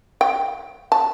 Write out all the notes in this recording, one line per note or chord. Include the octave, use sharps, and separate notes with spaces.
G5
A5